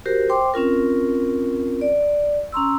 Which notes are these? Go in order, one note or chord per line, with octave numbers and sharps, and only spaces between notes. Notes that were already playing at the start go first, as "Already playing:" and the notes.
F#4 G4 A#4 C5
C5 G5 C6 D6
C4 C#4 F4 A#4
D5
C#4 A#5 C6 E6